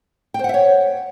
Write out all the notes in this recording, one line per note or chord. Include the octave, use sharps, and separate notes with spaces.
C5 C#5 E5 F#5 G5